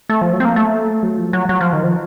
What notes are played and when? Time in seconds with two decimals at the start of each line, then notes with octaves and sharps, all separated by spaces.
0.09 A3
0.21 F3
0.33 F#3
0.40 C4
0.45 A#3
0.56 A3
1.03 F#3
1.18 F3
1.33 F#3
1.49 F#3
1.61 F3
1.73 D#3
1.83 F3